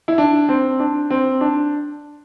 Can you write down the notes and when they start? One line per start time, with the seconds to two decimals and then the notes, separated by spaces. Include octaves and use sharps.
0.08 E4
0.18 D4
0.49 C4
0.80 D4
1.10 C4
1.41 D4